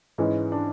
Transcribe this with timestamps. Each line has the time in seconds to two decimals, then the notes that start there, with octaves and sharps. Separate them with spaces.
0.18 G#2 E3 G#3 C#4
0.52 D4